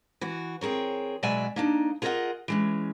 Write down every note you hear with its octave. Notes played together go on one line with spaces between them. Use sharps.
E3 F#4
C4 G#4 A#4 C#5
B2 F#3 G#3 D5 E5 G#5
A#3 D4 D#4
F4 G#4 A#4 C5 D#5 F#5
E3 G#3 C#4